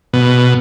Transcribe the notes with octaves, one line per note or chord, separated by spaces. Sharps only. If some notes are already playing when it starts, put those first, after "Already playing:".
B2